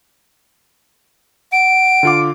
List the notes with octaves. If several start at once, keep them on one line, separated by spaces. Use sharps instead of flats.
F#5 D7
D3 F4 D6